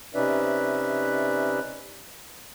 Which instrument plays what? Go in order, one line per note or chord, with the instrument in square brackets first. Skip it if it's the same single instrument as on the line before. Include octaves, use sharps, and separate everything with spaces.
[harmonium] C3 C#4 D#4 B4 D5 E5